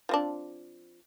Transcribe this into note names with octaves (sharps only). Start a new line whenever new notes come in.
F3 C4 D4